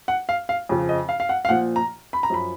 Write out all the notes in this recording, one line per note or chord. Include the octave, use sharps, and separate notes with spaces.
F#5
F5
F5
F2 C#3 F3
D#5
F5
F5
F#5
F5
A#2 F3 F#5
A#5
B5
A#5
F#2 F3 B5